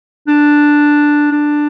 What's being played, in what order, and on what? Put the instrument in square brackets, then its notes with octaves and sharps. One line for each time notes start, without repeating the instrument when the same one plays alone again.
[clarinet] D4
D4